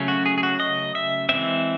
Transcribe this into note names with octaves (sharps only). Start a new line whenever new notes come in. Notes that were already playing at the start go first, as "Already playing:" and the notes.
Already playing: C#3 F#3 A3 C#4
F#4
G#4
G#4
F#4
D#5
E5
E3 G#3 C4 E5